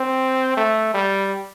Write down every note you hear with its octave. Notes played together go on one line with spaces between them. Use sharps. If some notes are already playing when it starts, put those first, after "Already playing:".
Already playing: C4
A3
G3